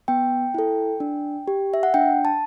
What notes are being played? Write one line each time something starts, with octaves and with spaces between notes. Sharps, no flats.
B3 G5
E4 A4
D4
G4
E5
F#5
D4 G5
A5